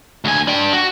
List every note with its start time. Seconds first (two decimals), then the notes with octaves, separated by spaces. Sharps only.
0.25 D2 G#5
0.48 D4 G5
0.73 F#4